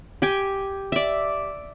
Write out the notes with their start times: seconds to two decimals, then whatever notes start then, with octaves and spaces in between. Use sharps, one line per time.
0.22 G4 G5 G#5
0.92 D5 E5